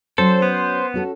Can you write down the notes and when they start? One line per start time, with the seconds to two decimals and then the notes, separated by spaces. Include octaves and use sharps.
0.18 F#3 C#4 A4 C5
0.42 B3
0.94 C#4 F#4 A4